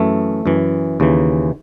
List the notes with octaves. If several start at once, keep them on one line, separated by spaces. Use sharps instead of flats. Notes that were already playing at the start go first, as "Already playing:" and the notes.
Already playing: F#2 E3 A3
F#2 E3
D#2 C#3 E3